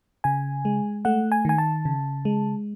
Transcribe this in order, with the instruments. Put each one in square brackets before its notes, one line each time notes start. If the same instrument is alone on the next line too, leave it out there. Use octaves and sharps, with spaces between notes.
[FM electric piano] C#3 G#5
G#3
A3 F#5
G#5
D#3 G#5
A5
C#3
G#3